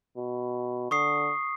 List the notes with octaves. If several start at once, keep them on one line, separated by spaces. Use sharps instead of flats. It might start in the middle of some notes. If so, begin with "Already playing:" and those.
B2
D3 C#6 D#6 C7